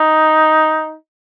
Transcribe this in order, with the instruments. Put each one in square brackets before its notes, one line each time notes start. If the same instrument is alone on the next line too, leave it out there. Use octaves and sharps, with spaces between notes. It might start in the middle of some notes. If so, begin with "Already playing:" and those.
Already playing: [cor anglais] D#4